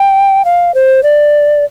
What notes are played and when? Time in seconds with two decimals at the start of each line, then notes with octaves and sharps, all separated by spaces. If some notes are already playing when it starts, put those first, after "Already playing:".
Already playing: G5
0.45 F5
0.74 C5
1.03 D5